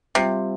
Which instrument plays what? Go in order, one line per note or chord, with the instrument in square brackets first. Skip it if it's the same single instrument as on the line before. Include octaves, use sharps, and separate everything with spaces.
[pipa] C3 [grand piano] G3 C4 F4